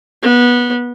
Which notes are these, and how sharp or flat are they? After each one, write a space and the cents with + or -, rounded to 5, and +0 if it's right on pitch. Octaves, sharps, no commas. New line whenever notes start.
B3 -20